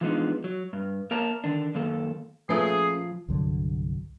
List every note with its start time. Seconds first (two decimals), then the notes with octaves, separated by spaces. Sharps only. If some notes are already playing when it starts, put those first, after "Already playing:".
0.01 E3 F3 G#3 B3 D4 D#4
0.44 F#3
0.73 G2
1.11 A#3 A#4 C#5 A5 A#5
1.44 D3 D#3 D4
1.75 F#2 D#3 A#3 A4
2.49 A#2 F3 A3 C#4 G#4 B4 C7
3.28 C2 G2 D3 F#3